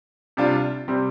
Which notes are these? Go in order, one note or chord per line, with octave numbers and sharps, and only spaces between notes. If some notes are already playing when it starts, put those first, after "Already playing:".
C3 G3 D4 F4
C3 G3 C4